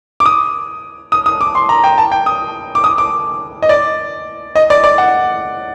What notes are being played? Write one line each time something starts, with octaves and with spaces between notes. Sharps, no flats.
D6
D#6
D#6
D#6
D6
C6
A#5
G5
A5
G5
D#6
D6
D#6
D6
D#5
D5
D#5
D5
D5
F#5